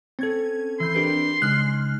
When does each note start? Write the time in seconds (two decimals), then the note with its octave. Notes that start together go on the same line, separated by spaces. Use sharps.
0.19 C4 C#4 A4 G#6
0.80 E3 C6 G6
0.95 D4 G4 A#4 B4 C7
1.42 C#3 G#3 D#4 F6 F#6